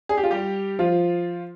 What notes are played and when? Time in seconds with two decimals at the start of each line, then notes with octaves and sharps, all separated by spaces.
0.09 G#4
0.17 G4
0.23 F4
0.31 G3 G4
0.79 F3 F4